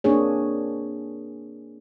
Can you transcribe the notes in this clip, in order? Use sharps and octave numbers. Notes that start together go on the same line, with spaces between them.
A#3 C4 D4 G#4 C#5